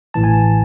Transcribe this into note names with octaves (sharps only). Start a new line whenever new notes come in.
A1 A2 E3 A5
G#5
A5